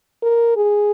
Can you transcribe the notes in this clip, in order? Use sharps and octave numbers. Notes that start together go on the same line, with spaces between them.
A#4
G#4